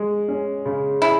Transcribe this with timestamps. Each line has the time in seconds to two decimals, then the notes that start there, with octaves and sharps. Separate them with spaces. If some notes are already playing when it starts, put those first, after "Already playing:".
Already playing: G#3
0.28 C#4
0.65 C#3
1.02 E4 G#4